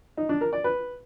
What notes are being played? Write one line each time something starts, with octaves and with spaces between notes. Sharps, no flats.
D#4
D4
A#4
D5
B4